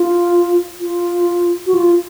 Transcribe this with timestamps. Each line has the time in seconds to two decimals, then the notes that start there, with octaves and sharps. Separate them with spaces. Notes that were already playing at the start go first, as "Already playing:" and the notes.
Already playing: F4
0.80 F4
1.66 F#4
1.74 F4